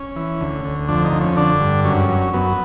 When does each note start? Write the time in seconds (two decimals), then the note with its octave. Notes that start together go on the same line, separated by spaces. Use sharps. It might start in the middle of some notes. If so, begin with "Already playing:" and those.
Already playing: C#4
0.16 E3
0.40 D2
0.64 D2
0.89 F2 D4
1.04 D#4
1.13 F2
1.21 C#4
1.37 D3 D4
1.61 G2
1.84 F#2 C#4
2.09 F#2
2.34 F#2 B3